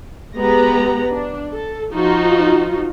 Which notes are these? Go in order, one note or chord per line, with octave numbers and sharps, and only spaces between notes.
G#3 B3 G4 B4 A#5
D4
A4
F3 D#4 F4 F#4